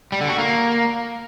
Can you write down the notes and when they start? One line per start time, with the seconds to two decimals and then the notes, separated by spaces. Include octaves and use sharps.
0.12 G3
0.21 D3
0.30 F#4
0.38 A#3